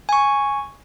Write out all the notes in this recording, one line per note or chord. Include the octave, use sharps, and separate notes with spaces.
G#5 C#6